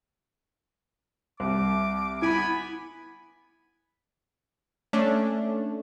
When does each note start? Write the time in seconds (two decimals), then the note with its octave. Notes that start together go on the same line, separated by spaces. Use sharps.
1.40 C2 D6
2.22 B3 E4 G#5 B5 D7
4.93 A3 C#4 D4